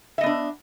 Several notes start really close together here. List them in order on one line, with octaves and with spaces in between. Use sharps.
E5 D#5 B3 D4